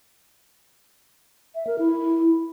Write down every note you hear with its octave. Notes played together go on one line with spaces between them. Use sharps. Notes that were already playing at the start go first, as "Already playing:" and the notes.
E5
A#4
E4